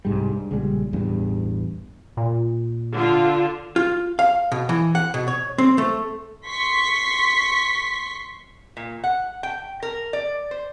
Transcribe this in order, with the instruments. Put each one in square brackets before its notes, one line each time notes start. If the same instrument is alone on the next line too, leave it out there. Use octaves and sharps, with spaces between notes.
[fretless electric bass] C2 G#2 G3
G2
A#1 C#3 G3 G#3
A1 E2 G2
[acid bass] A#2
[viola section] D3 F4
[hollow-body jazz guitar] F4
F5
B2
E3
F#5
B2
C#5
C4
A3
[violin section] C6 C#6 B6 C7
[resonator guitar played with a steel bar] A#2
F#5
G5
A#4
D5
C5